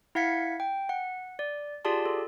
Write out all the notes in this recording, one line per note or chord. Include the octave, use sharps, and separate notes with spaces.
E4 F5 F#5 G#6 B6 C#7
G5
F#5
D5
F4 G4 G#4 D5 A5 C6
A4